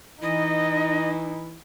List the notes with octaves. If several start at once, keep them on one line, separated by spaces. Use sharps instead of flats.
E3 D#4 E4 D#5